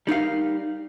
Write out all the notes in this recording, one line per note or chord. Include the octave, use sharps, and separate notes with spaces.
G3 D#4 A#4 F5